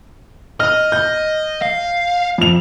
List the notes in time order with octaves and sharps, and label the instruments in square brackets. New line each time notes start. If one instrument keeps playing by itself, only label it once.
[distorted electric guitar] D#5 [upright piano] F6
[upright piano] G6
[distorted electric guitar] F5
[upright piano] F2 F7